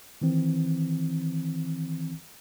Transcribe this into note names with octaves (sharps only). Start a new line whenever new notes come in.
D#3 E3 C4